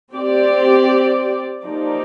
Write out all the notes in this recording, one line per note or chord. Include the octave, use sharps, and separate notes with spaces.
C4 G4 D5
F3 A#3 D#4 G4 D5